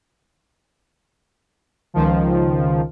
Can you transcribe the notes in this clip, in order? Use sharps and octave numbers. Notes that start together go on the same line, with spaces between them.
C#2 D#3 F3